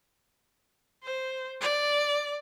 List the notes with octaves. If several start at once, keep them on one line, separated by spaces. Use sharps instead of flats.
C5
D5